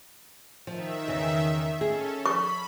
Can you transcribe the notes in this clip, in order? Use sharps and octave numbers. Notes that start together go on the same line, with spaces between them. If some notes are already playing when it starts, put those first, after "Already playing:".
D#3 F3 E5
E2 C#3
C#4 G#4 A4
B5 C#6